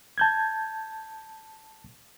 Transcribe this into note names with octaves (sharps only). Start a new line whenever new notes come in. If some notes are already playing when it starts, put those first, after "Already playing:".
A5 G6 G#6